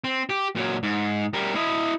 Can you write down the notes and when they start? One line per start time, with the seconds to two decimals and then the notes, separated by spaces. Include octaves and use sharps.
0.04 C4
0.30 G4
0.56 A#2 F#3
0.83 G#2
1.33 G3 A#4
1.55 E4 D#5